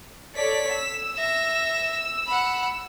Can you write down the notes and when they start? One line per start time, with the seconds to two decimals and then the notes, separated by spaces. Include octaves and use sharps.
0.37 A4 C#5 D5 B6
0.74 E6
1.16 E5 A#6
2.27 F#5 B5